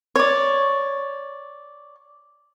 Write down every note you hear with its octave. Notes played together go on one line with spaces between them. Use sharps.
C#5 D5